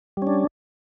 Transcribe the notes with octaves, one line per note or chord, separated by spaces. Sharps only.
G3 C#4 D4